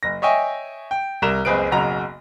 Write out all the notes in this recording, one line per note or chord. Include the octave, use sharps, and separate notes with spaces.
F#1 A#6
C#5 D#5 E5 G5 G#5
G5
C2 A#4 A#5 E7
F#1 C#2 C4 G#4 B4 D7
F#1 B1 C#3 F#4 A#5 F7